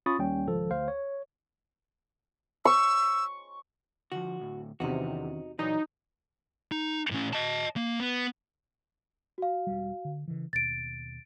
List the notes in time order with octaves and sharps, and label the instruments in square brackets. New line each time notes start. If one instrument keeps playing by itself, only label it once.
[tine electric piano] C#4 F4 B5 C#6 D#6 A6
D#2 G3 C#4 G5
G#1 C#2 F3 A4
D2 C5 F5
C#5
[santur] C#6 [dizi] E6
[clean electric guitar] D3 F3 [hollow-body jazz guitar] F#4
[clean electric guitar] D2 A2
[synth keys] E2 C3 [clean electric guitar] D#3 C#4 [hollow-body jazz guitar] D#4 F#4
[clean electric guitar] A#2 D5 [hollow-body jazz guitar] E3 F#3 [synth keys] D#4
[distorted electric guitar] D#4
A2 C#4
D#5 A5
A#3
B3
[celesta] F#4 F5
[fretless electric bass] E1 G3
D3
C#3 E3
[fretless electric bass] D#2 B2 [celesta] A6 D7